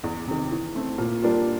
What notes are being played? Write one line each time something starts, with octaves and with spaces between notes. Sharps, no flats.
E2
C3 D#3
E3
A3 C4
A#2
G3 A#3 D4 F4